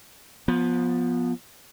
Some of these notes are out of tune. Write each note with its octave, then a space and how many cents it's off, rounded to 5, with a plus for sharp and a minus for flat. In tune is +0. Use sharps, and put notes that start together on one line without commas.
F3 +15 B3 -10